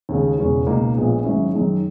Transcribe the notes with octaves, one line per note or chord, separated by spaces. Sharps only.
D#2 C#3 G#3
E1 E2 C#3 G#3 C#4
C#2 B2 A#3 D#4 G#4
A#1 A#2 G#3 B3
G#1 G#2 F#3 C#4 E4
F#2 D#3 G#3